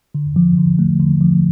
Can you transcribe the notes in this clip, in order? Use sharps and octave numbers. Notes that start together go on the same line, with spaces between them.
D3
F3
D3
A3
D3
F3